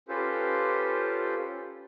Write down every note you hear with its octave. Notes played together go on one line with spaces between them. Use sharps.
C#4 F4 G4 A4 B4 C5